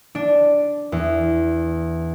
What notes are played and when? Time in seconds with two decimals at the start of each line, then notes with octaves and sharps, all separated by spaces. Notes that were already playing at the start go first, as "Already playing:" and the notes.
0.15 D4
0.92 E2